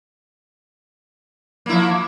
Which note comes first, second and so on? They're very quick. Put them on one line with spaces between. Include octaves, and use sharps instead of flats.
A#3 E4 F3